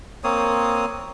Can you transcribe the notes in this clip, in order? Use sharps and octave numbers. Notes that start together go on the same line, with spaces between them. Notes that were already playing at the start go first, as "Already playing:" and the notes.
A#3 C4 C#5 D#6